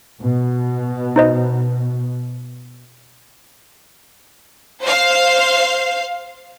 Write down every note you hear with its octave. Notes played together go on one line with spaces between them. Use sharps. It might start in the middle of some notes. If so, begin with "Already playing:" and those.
B2
D#4 C5 D#5
C5 F5